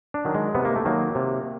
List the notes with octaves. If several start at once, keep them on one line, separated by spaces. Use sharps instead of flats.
D4
D#3 F#3
G#3
C3 B3
A#3
A3
D#3 F#3 A#3
C3